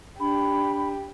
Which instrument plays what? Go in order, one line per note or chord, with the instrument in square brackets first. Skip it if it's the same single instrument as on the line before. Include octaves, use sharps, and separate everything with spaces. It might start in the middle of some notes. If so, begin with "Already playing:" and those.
[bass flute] D4 [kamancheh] G4 [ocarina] B5